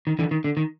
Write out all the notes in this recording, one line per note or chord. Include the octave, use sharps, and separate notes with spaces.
D#3
D3 E3
D#3
D3
D#3